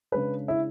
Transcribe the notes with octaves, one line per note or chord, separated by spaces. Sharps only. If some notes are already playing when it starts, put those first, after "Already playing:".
C#3 G#3 D4 B4
E4